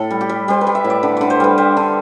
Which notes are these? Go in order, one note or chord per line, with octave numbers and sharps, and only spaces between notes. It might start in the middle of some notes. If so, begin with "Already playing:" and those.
Already playing: A2 A4
G3
G4
G3
G3 C5
B4
G3
E5
A2
D5
D3
D3 D5
C5
G3 B4
G3 C5
D3